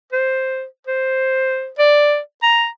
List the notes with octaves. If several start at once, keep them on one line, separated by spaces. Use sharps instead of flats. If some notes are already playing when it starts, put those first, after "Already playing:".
C5
C5
D5
A#5